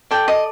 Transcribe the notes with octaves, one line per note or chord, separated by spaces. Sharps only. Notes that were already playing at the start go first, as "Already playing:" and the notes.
A4 D5 G5
D#5